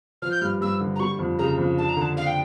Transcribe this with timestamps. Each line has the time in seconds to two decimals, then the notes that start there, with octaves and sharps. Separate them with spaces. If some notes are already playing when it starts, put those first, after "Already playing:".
0.22 F3 F6
0.31 G6
0.41 G2 F6
0.61 G2 E6
0.80 D3
0.96 A#5
1.00 G3 C#6
1.19 F2
1.39 C#3 A#5
1.58 F2
1.78 D4 A5
1.89 A#5
1.97 D3 A5
2.16 D4 F5
2.27 G5